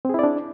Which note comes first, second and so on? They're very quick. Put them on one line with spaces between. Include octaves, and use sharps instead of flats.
C4 G#4 E4 D5 D4